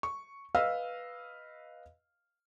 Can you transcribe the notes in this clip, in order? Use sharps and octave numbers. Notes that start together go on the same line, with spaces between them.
C#6
B4 D#5 F5 E6 F6